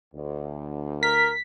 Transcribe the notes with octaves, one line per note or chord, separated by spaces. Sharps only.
D2
A#4 B6